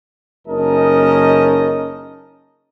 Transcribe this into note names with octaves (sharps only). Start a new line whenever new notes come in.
F#1 C#4 D#4 A#4 D#5 A5